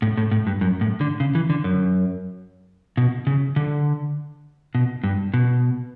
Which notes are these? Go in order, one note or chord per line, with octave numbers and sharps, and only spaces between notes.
A2
A2
A2
G2
F#2
A2
D3
C#3
E3
D3
F#2
B2
C#3
D3
B2
G2
B2